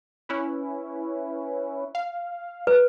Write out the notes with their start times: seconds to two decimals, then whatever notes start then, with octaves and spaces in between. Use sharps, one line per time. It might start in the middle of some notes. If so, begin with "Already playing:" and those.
0.29 C#4 E4 B4
1.95 F5
2.67 B4